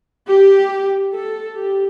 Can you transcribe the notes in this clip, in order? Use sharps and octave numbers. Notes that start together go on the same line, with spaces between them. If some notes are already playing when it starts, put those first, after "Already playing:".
G4
A4
G4